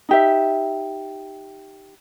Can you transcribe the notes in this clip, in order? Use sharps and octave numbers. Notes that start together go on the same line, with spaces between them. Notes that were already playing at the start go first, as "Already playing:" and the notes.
D#4 G4 E5